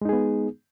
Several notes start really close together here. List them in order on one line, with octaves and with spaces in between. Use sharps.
G#3 D#4 G#4 B3